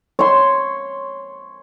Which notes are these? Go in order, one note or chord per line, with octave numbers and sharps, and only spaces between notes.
C#5 C6